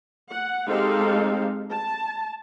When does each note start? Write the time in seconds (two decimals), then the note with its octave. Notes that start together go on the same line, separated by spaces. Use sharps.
0.29 F#5
0.67 G#3 C4 D#4 G4 A4 F5
1.71 A5